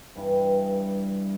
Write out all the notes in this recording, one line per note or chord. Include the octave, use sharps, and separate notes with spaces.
G2 E3 G3 D4